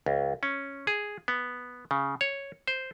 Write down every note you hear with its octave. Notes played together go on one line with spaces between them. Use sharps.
C#2
C#4
G#4
B3
C#3
C#5
C5